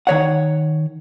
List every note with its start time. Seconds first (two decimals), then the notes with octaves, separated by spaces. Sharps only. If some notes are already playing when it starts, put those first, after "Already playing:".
0.07 D#3 C#5 F#5